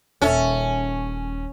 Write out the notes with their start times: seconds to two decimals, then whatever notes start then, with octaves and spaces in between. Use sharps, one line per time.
0.22 D#1 C#4 A4 E5